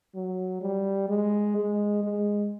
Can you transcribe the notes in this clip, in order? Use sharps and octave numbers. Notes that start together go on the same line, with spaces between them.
F#3
G3
G#3
G#3
G#3